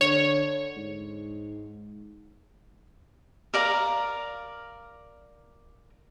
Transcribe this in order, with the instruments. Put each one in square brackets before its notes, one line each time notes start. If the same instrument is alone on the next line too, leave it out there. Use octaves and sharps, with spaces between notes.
[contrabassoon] D3 [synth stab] C#5
[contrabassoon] G#2
[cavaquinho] A#4 D5 F5 A#5